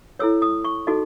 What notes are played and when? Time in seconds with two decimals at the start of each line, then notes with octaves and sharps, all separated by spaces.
0.19 E4 A4 C#5 E6
0.42 D#6
0.64 C#6
0.87 D#4 F#4 A4 D#5